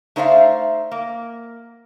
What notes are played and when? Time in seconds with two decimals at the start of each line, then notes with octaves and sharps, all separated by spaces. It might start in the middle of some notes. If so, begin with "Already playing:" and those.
0.16 A3 D#4 C5 D5 E5 F5
0.91 A#3